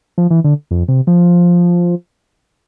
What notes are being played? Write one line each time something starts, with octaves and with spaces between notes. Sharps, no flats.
F3
E3
D3
F2
C3
F3